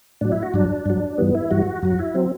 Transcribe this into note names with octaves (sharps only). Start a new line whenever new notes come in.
A2 F#3 D4
E4
F#4
G2 F#3 D4
G2 F#3
G2 E3 G3 B3
E4
G2 E3 G3 F#4
F#2 F#3 F#4
E4
F#3 C4